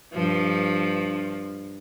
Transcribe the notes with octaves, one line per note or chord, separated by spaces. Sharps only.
G2 F3